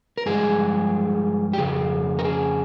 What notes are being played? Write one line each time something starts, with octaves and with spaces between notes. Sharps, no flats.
A#4
G2 F3 G#3 G#4
G4
F2 C#3 G#4
A#4
G#4